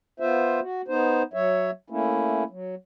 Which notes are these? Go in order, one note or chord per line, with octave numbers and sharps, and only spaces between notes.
B3 F4 C5 E5
F#4
B3 D#4 C5
F#3 C#5 E5
A3 A#3 C#4 E4
F#3